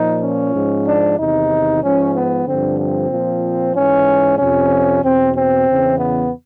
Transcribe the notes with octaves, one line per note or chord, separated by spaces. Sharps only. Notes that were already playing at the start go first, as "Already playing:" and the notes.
Already playing: A#2 F3 D#4
C#4
G#2 F3
D4
E2 C3 D#3 D#4
G#2 F3 C#4
B3
G2 D3 F3 C4
C4
A#2 F3
G#2 E3 C#4
F2 C3 F3 C#4
E2 B2 C4
C4
E2 C#3 E3
B3